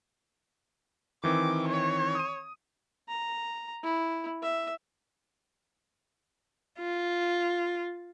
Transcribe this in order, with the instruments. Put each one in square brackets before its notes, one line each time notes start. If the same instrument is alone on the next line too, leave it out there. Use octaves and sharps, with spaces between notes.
[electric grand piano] D#3 E3 C4 [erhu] D6
[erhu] C#5
[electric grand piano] D#6 D#7
[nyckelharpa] A#5
E4
E5
[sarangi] F4